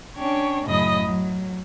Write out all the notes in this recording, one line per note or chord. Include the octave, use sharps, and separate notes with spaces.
C#4 D4 C#5 G5
F#2 A2 C#3 D#5 B5 D#6
F#3